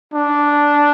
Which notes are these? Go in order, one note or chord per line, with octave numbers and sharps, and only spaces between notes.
D4